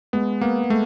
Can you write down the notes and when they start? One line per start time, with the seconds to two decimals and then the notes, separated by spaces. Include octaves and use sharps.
0.13 G#3 B3
0.41 A#3 B3
0.70 G#3 A3